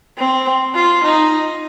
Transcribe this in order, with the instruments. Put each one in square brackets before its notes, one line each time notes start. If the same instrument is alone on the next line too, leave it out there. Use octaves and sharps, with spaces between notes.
[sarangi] C4
F4
D#4